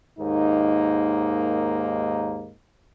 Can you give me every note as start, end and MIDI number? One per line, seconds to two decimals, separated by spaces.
0.19 2.52 39
0.19 2.52 44
0.19 2.52 58
0.19 2.52 63